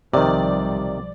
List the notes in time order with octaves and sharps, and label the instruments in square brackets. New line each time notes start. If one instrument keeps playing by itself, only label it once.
[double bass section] B1 F3 G3 [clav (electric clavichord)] C3 D#3 [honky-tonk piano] D5